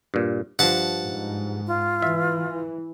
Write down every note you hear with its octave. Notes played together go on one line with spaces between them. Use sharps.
G2 A#2
G2 F3 F#5 A5
G#2
F4
E3 E5